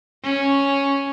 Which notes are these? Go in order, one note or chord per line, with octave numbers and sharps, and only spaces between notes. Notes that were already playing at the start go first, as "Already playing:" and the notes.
C#4